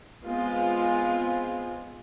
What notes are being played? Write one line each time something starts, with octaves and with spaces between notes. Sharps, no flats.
G#3 B3 C4 F4